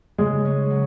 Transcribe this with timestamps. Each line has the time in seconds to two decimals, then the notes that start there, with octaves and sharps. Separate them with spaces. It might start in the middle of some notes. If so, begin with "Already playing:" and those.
0.18 C#3 G#3
0.45 C#4
0.70 F#3